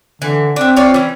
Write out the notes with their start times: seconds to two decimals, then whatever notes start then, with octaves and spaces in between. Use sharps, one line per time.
0.22 D3 E3
0.56 C4 D4 E5
0.76 F4 C#5 D5
0.94 E3 C#4